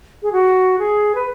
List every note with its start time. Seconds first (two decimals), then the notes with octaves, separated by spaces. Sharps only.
0.23 G#4
0.32 F#4
0.79 G#4
1.15 B4